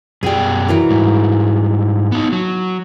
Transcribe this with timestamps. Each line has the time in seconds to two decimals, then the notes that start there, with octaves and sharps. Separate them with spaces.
0.23 F#2 B2 G3 G#4 G5
0.68 E3 F#3 A#4
0.90 G#2 G3
2.12 B3 D#4
2.32 F#3